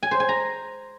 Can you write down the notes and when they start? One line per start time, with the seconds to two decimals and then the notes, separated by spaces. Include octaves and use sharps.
0.03 G#5
0.11 C5
0.20 G#5
0.29 A#5